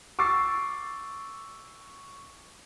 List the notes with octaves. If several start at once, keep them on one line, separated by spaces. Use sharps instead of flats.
C#6 D6 E6 A6 C7